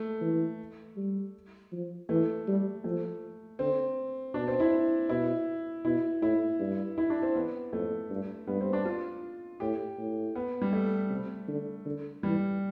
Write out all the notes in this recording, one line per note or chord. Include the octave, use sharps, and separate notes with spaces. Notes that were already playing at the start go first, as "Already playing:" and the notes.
Already playing: A3
E3
G3
F3
E3 A3
G3
F3 A3
D3 C4
B2 D4
C4
E4
B2 E4
B2 E4
A2 E4
G2
E4
D4
C4
E2 B3
F2 A3
G2
G2 B3
C4
D4
F4
A2 G4
A2
B3
G3
A3
C3
D3
D3
E3 G3